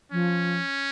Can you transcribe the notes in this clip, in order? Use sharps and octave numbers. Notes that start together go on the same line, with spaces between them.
F3 C#4